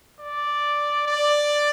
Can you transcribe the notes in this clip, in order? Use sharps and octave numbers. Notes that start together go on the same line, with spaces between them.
D5
D5